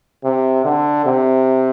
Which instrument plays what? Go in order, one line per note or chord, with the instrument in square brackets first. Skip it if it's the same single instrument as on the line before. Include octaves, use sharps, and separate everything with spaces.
[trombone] C3
D3
C3